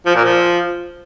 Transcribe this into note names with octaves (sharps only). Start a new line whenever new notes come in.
F3
A#2
F3